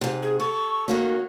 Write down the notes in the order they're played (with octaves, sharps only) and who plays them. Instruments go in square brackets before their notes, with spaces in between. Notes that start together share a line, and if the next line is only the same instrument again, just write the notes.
[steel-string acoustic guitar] G#2 C3
[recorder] G#4
[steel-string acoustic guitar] A4 [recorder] C#6
[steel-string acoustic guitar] D#3 A#3 C#4 [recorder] F#4